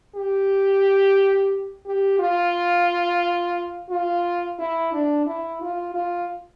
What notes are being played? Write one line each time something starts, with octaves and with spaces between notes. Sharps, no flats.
G4
G4
F4
F4
E4
D4
E4
F4
F4